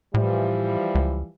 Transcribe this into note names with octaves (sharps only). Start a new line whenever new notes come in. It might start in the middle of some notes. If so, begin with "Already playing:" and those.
A2 E3 F3 G3
C#2